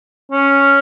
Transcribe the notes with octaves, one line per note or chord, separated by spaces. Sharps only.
C#4